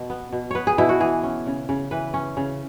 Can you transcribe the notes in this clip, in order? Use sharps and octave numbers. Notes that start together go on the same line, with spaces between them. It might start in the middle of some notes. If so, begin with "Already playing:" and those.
Already playing: B2
B3
B2
B3 B4 C#5
G#4
B2 E4
F#4
E3 G#4
C#4
C#3
C#3
E3 B4
C#4
C#3